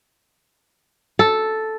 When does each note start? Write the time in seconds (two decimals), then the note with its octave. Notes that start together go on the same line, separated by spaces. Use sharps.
1.19 A4